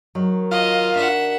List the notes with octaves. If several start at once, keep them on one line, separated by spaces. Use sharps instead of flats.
D#3 F#3
F4 D#5
D4 F#4 E5 F#5